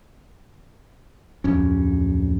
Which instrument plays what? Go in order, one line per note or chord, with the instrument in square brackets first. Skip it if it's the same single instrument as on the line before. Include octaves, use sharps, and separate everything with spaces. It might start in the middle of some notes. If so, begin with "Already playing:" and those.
[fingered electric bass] D1 F2 C#4